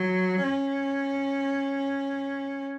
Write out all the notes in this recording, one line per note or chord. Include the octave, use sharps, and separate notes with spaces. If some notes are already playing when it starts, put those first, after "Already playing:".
Already playing: F#3
C#4